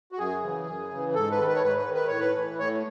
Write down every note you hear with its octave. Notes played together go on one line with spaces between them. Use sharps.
F#4
F#2 G#4
C#3 E3
F#2
C#3 E3
G#2 A4
B4
D#3 A4
B4
C#5
G#2 B4
B4
D#3
B4
A2 C#5
B4
E3
A2 C#5